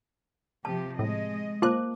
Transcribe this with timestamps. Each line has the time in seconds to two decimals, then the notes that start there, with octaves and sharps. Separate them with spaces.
0.65 C3 F3 G4 A5
0.99 A2 G#3 D#5
1.62 A#3 F4 C5 A5 D6 F#6